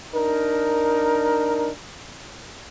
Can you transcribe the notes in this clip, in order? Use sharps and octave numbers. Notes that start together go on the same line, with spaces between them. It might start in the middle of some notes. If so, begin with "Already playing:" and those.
D4 D#4 A#4